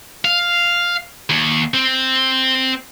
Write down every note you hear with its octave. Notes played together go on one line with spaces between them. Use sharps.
F5
D#2
C4